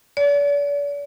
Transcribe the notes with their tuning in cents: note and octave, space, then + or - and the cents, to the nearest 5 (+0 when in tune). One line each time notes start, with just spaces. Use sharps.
D5 -40